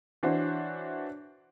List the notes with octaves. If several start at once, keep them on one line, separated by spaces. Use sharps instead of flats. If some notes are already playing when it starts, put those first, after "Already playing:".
E3 D4 F#4 C5 C#5